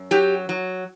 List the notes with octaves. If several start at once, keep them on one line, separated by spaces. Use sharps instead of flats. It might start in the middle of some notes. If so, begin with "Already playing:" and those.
Already playing: F#2
F#3 G4
F#3